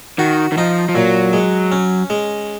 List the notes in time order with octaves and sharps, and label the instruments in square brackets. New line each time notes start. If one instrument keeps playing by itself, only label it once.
[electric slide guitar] D#3 [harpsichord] F#4
[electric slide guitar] D#3
[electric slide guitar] F3 [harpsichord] D#4
[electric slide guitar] F3
[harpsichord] A#2 [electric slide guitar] F#3
[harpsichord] G#3
C#4
G#3